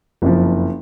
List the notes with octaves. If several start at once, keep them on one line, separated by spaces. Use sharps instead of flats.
F#1 F2 F3